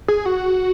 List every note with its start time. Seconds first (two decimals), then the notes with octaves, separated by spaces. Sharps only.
0.08 G#4
0.26 F#4